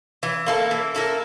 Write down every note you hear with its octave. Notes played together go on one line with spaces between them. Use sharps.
E3
A#3 E4 A4
E3
A#3 E4 A4